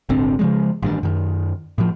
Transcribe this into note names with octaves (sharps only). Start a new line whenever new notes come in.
D#1 G#1 D3 C4
C#3 F3 G#3
A1 G2 D#3
F#2 D#3
A2 F3